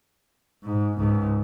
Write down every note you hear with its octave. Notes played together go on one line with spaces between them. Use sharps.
G#2
C#2 G#2